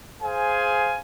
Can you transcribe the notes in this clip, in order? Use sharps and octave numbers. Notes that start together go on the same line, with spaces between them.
G#4 C5 F5 G#5